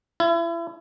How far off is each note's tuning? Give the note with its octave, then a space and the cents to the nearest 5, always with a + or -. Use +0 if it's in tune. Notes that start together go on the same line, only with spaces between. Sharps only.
E4 +35